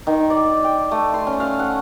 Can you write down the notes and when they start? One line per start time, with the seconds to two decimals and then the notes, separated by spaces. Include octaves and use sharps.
0.07 D#3
0.30 D5
0.64 G5
0.91 A3
1.14 C6
1.27 C#4
1.40 F5
1.59 F#5